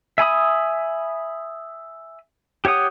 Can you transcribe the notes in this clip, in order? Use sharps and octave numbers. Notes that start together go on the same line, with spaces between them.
E5 G#5 B5 D#6
G4 C#5 F#5 D#6